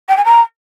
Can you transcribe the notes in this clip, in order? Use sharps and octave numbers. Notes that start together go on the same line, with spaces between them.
G5
G#5
A#5